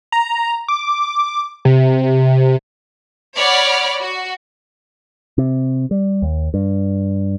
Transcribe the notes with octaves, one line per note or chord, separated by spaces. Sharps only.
A#5
D6
C3
C#5 D5 F#5 B5 D6 F6
F#4
C3
G3
D#2
G2